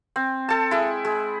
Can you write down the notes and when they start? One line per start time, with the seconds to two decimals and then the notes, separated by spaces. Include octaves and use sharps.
0.16 C4
0.49 A4 A5
0.71 G#3 E4
1.05 G#3